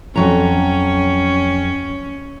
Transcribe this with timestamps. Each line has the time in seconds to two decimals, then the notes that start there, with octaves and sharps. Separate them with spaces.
0.16 F2 F#3 C#4 A#5